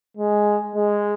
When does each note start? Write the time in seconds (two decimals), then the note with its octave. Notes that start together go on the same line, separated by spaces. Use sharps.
0.17 G#3
0.76 G#3